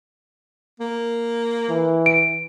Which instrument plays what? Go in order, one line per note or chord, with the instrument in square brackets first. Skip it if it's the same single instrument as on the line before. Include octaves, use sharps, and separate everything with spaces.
[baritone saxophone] A#3
[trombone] E3
[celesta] D7